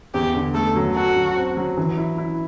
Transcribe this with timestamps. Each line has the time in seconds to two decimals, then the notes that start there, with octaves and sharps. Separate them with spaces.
0.14 E2 G4
0.34 D3
0.55 A3 A4
0.76 F#3
0.96 F#4 A4
1.16 F#3
1.36 C4
1.57 F#3
1.77 E3
1.98 E4
2.18 E4